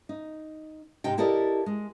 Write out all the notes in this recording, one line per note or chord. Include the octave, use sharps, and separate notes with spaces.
D#4
G#2 C3 D#4 G5
E4 G4 A4 A#4 D5 D#5
G#3